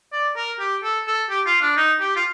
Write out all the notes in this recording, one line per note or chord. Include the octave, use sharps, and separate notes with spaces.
D5
A#4
G4
A4
A4
G4
F4
D4
D#4
G4
F4